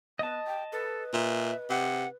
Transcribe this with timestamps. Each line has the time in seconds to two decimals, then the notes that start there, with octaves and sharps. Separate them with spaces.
0.19 B3 D#5 A5
0.47 G5
0.72 A4 B4
1.13 A#2 E5
1.70 C3 F#5